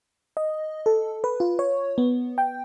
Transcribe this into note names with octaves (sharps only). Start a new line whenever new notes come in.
D#5
A4
B4
F4
C#5
B3
G5